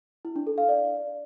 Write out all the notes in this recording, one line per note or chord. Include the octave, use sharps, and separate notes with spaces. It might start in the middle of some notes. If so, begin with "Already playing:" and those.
E4
D4
A4
F5
D5